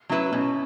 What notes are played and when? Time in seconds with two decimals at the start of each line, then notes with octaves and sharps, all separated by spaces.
0.09 F#3 C#4 E4 B4
0.32 B2 C#4